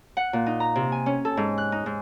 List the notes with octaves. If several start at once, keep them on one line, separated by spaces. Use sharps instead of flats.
F#5
A#2
D#4
A#5
C3
G#5
C#4
A4
G#2
F#6
D#4
G#2